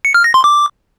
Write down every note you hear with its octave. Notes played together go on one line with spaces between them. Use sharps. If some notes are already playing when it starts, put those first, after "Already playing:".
C#7
F6
A#6
C6
D6